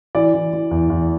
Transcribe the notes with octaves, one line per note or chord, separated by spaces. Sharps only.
E3 D5
E3
E3
E2
E2